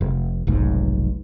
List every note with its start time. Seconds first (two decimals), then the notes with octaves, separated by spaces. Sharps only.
0.01 F1
0.47 F1 B1 G#2